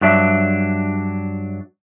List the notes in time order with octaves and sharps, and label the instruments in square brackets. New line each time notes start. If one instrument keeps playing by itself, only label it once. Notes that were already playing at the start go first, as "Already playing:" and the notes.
[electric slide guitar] G2 F#3 D4 E5